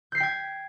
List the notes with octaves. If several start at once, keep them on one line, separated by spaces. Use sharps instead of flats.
G5 G6 G#6 B6 C7